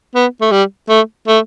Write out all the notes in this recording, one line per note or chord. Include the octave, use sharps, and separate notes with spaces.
B3
A3
G3
A3
A3